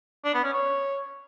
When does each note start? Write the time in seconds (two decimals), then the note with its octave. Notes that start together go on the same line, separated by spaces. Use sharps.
0.25 D4
0.34 B3
0.44 C#4
0.53 C#5